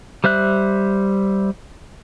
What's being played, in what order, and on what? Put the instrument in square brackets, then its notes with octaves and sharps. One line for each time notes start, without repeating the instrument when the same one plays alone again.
[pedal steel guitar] G3 C5 E5 F#6